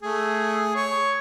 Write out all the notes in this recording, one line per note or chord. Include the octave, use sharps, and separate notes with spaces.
A3 G#4
C#5